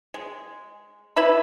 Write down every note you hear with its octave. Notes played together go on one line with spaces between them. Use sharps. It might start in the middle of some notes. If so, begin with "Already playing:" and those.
G#3
E4 B4 E5 B5